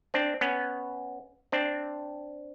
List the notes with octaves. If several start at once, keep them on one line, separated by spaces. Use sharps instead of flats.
C4 D4
B3 C#4
C4 D4